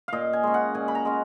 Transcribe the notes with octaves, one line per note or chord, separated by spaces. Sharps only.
A#2 D#5 F5
G#5
G#3 C#4
F#5
A#2 G#5
B5
A#5
G#3 C#4